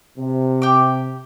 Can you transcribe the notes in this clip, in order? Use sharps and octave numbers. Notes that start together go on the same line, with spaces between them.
C3
G4 D6